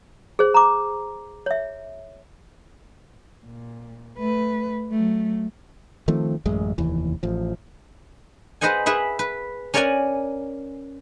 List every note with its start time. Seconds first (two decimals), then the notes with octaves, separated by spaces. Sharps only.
0.39 G#4 C5
0.54 A#5 D6
1.46 C#5 E5
3.45 A#2
4.18 A3 B4
4.90 F#3 A3
6.08 D#3 F3 A3 C4
6.45 A1 F#2 G#3
6.78 F1 D#2 E3
7.23 A1 F3
8.61 G#4 B4 C5 D#5 F#5 G#5
8.86 G#4 B4 E5 F#5
9.19 B4
9.74 C#4 A#4 C#5 D5 F#5 G#5